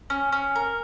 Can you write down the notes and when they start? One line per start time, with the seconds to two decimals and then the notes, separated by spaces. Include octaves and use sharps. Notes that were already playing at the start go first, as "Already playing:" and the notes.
0.10 C#4
0.32 C#4
0.56 A#4